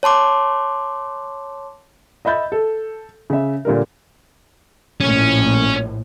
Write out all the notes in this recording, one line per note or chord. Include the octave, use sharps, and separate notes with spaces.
C#5 A5 C6 D6
D#5 E5 B5 G6 A6
A4
C#3 E5
A#2 D3 G3 A#4
A#1 A2 C#4